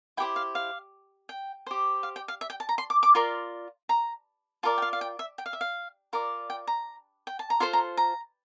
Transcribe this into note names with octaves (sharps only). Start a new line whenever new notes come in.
E4 G4 C5 G5
F5
F5
G5
G4 C5
F5
G5
F5
E5
G5
A5
A#5
C6
D6
D6
F4 A#4 D5 C6
A#5
F4 A#4 D5 A5
G5
F5
F5
G5
E5
G5
F5
E5
F5
F4 A#4 D5
G5
A#5
G5
A5
A#5
F4 A4 C5 C6
A#5
A#5